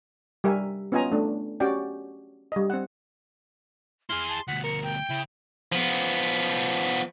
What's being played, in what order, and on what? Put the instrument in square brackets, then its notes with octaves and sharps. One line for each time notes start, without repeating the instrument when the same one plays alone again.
[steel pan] G3 G4 A#4 E5 G#5
B3 C#4 F4 D#5 G#5 A#5
A3 D4
C#4 F#4 G4 D5 G5
G3 D#5
C4 F#5
[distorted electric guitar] E4 G#4 [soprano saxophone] C6 [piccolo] F6
[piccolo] A5
[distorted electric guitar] D2 B2 [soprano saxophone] F#5 [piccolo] B6
[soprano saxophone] A#4 [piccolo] C#7
[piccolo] G5
[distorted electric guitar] C#3 [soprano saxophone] E4
[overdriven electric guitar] F3 B3